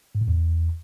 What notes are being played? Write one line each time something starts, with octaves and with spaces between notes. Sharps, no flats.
G#2
A2
E2